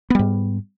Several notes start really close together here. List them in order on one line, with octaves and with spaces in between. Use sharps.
B3 G3 G#2